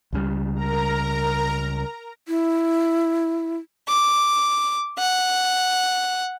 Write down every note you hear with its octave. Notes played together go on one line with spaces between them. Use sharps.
C#2 C#3 G3
A#4 A#5
E4
D6
F#5